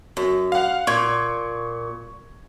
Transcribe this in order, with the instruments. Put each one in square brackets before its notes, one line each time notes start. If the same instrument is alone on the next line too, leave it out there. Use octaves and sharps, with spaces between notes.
[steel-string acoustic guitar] F#2
[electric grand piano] F5 F#5
[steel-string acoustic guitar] A#2 [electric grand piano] C#6 G#6